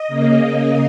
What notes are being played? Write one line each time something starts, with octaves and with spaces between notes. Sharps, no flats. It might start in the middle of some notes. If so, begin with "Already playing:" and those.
Already playing: D#5
C#3 A#3